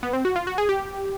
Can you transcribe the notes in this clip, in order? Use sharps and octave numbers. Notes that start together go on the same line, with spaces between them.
B3
C4
F#4
F4
F#4
G#4
G4